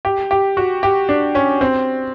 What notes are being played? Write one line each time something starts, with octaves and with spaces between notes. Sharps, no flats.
G4
G4
F#4
G4
D4
C#4
C4